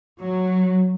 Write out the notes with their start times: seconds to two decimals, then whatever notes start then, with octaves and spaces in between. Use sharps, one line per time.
0.22 F#3